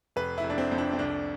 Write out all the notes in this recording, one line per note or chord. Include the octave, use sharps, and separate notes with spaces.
F1 B4
E4
F1
D4
C4
F2
D4
C4
C2 D4